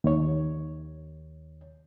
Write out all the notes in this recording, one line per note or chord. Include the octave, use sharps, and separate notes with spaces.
D#2 C#5